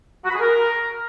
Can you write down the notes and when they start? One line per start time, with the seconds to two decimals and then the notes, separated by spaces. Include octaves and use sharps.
0.24 F#4
0.29 B5
0.34 G#4
0.40 A#4